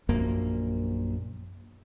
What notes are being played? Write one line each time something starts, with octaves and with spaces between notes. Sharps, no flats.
A#1 F#2 A#3